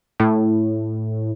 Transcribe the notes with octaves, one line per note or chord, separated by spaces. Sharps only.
A2